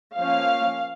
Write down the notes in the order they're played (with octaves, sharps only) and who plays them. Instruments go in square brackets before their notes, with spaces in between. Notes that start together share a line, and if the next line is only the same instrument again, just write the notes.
[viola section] F3 A#3 C#4 F5